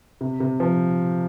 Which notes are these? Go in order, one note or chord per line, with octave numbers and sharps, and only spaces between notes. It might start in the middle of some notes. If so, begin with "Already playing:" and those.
C3
C3
F3